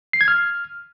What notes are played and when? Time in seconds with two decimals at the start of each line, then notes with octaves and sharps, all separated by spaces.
0.13 C7
0.21 G#6
0.28 F6